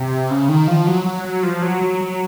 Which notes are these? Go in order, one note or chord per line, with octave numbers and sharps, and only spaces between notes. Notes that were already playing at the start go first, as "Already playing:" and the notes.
Already playing: C3
C#3
D#3
F3
F#3
F#3
F#3
F3
F#3
F#3
F#3